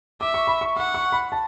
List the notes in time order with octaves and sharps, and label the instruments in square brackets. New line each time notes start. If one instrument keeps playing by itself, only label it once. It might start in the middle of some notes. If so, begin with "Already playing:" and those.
[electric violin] E5 [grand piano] D6
[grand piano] C#6
B5
C#6
[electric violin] F#5 [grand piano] C#6
[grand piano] C#6
B5
A5